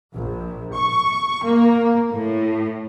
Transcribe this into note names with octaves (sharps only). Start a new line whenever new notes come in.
A#1
C#6
A#3
A2